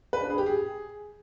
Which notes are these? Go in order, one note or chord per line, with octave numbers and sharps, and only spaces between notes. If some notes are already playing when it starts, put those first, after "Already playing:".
B4
D4
G#4
G4
G#4